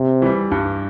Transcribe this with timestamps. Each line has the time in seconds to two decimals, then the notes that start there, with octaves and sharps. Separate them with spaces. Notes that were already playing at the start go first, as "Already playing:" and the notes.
Already playing: C3
0.22 E3 G3
0.52 G2